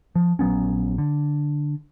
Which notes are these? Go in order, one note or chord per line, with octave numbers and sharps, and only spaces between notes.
F3
A#1 F#3 B3 C#4
D3